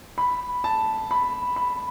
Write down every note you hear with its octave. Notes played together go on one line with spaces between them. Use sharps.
B5
A5
B5
B5